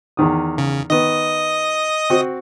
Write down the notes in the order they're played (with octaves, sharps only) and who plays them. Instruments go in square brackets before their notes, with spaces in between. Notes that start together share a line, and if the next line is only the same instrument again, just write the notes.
[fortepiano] E2 D#3 D#6
[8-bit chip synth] C#3
[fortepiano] D#3 B3 [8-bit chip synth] D#5 D#6
[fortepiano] C4 F#4